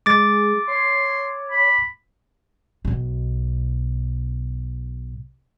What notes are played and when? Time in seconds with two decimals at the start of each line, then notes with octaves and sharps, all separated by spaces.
0.06 G#3 D6 A6
0.68 C#5 C6
1.51 B5
2.85 B1 B2